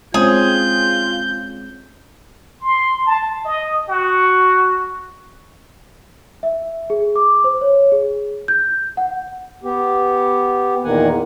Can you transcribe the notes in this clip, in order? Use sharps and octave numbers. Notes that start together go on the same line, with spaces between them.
G#3 C4 C#4 F4 G#4 G6
C6
A5
D#5
F#4
E5
G#4
D6
C5
C#5
G#4
G6
F#5
B3 G4
E2 A#2 D#3 A#3 F#5 G#5